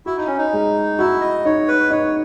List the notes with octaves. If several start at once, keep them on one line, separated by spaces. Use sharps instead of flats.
E4 F#4
D#4
C#4
D#4
G#3
E4 F#4
D#5
D#4 C#5
B4
D#4 C#5